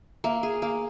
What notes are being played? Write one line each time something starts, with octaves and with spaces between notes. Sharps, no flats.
A#3 E5
G#4
A#3 F5